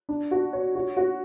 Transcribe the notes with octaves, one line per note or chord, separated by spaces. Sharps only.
D4
F#4
C#5
F#4
F#4